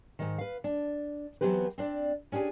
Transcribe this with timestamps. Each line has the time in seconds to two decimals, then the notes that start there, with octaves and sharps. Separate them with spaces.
0.19 G#2 D#3
0.38 B4 F5
0.64 D4
1.41 E3 F#3 B3 C4 G4 B4
1.78 C4 D4 D5
2.32 C#4 D4 G4 G#4 G#5